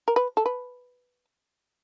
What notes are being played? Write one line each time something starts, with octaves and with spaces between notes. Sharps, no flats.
A#4
B4
A4
B4